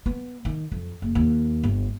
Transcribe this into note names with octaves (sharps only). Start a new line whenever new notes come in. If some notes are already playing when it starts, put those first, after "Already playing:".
B3
D#3
F2
F#1
D#2
G1